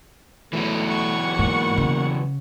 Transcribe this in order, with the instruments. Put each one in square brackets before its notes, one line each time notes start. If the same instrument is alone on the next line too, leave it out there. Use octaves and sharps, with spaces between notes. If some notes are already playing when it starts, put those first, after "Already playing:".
[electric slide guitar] E3 F#3 B3 [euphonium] A3
[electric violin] F#5 C#6
[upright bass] G#2 [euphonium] A#3
[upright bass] C#3